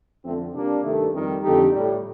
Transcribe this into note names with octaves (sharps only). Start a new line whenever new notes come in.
F2 D3 F3 A3 C4
C3 G3 A#3 D4
G2 D#3 A3
F2 C3 D#3 G3
F2 D3 A3 D#4 G4
A2 G3